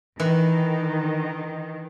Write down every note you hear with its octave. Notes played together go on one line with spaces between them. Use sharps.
D#3 E3